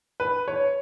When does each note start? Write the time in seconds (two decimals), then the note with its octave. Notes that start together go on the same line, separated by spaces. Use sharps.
0.20 B4
0.48 C#5